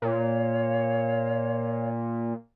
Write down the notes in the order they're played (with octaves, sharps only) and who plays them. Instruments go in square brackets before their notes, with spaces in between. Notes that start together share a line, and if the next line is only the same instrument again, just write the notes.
[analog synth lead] A#2 [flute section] C#5 F5